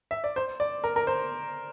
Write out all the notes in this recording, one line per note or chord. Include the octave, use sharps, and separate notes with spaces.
E5
D5
C5
D5
A#4
A#4
C5